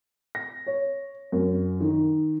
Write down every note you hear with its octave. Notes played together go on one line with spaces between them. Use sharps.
A#6
C#5
F#2
D#3